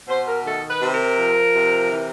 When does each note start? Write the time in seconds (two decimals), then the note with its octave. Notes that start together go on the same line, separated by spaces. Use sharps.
0.08 B2 C5
0.27 A#4
0.45 D#3 A4
0.70 B4
0.82 C3
0.94 A#4
1.18 F3
1.55 C3
1.92 E3